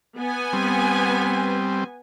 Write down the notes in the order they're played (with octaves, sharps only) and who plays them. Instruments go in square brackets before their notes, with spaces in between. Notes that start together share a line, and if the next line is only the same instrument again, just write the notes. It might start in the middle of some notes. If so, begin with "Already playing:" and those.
[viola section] B3 G#5
[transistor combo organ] G3 C4